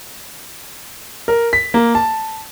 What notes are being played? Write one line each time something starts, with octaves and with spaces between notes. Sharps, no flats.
A#4
B6
A#3
A5